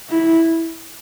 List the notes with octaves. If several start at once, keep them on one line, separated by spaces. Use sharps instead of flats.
E4